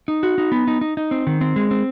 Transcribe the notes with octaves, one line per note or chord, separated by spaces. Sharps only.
D#4
F#4
D#4
B3
D#4
D#4
D#4
C4
D#3
C4
G#3
C4